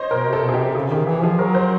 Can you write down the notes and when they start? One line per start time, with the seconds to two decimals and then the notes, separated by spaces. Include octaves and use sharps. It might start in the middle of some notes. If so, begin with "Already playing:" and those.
Already playing: C5 C#5 D#5
0.11 B2 A#4
0.27 C3
0.33 A4
0.43 B2
0.49 G#4
0.54 G4
0.60 C3
0.75 C#3 G#4
0.90 D#3 G4
1.06 E3 G#4
1.23 F3 G#4
1.39 F#3 A#4
1.55 C5